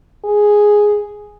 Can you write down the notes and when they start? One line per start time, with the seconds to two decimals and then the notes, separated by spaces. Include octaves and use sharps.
0.24 G#4